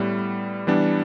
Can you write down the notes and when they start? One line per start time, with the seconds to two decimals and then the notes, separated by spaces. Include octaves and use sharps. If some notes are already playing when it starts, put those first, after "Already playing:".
Already playing: A2 G3 B3
0.67 E3 G3 B3 D4